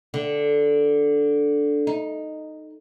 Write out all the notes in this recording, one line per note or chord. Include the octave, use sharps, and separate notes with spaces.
D3
D#4